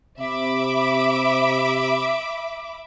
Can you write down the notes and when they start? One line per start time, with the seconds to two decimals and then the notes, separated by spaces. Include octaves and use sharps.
0.19 C3 E5 B5 D6